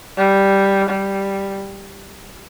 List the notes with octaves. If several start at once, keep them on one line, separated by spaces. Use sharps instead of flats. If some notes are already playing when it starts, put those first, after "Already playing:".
G3
G3